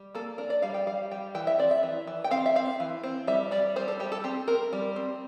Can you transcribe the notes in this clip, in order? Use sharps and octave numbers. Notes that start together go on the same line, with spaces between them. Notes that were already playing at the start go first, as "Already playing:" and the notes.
Already playing: G3
A#3 A4
D4 A#4
D5
G3 F5
G5
G3 F5
G3 G5
E3 G5
E5
C4 D5
E5
E3
E3
G5
C4 F5
E5
C4 F5
E3
C4
G3 E5
G3 D5
G3 C5
A4
G3 G4
A4
C4 G4
C4 A#4
G3
C4